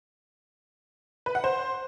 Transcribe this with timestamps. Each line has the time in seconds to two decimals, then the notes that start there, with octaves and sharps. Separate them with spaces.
1.26 B4
1.35 F#5
1.44 C5